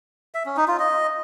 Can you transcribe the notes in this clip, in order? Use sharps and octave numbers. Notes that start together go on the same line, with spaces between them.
E5
C#4
D#4
F4
D#5